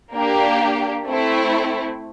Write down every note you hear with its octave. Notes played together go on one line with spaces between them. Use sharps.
A#3 D4 G4
A3 C4 E4